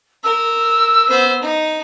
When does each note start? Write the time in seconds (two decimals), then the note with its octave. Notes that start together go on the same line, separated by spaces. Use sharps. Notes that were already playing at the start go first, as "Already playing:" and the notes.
0.24 A#4 E6
1.09 B3 C5
1.42 D#4